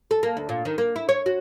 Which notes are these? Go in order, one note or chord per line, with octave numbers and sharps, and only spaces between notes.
A4
A#3
D2
A#2
D#3
A#3
E4
C#5
F#4